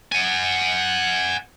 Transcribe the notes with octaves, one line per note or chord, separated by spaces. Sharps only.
F#5 G#5